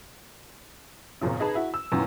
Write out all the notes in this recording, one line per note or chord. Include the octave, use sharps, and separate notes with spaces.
G#1 C#2 F#2 A#2 C#3
D#4 G#4 B4 A5 B5
E4 F#4
E6
F#2 A#2 D#3 E3 B3